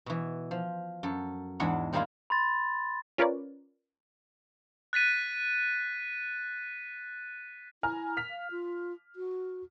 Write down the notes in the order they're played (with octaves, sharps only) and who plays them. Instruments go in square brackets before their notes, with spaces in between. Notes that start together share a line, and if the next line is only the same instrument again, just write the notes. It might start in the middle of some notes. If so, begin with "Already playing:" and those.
[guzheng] B2 E3
F3
F#2 A4
E2 G#2 G#3 D4 F#5 B5
D#3 G3 G#3 A#3 E4 F4
[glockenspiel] B5 C6 A6
[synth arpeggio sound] C#4 F4 A#4 B4 C#5 D5
[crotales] F#6 A6 B6 D#7
[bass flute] E4 [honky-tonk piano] G#5 A#5 F6
[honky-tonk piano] F6 B6 F7
[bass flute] F5
F4
F#4